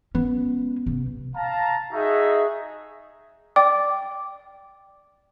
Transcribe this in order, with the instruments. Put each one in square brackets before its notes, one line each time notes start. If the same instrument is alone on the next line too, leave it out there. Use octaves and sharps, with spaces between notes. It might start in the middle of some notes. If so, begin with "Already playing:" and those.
[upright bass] G#3 C#4 [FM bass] B3
[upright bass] C3
[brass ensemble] F5 A5 A#5
D#4 F#4 G#4 D#5 E5
[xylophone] D5 G5 D6